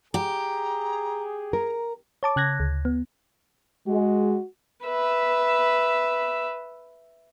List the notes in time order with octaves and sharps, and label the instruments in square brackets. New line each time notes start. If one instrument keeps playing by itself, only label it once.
[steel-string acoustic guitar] G4 [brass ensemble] G#4 [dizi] A#5
[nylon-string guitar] A#4 [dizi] A#5
[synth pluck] C#5 A5 D6
C#3 F#6 G#6 A#6
D2
B3
[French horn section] G#3 [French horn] F#4
[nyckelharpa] B4 E5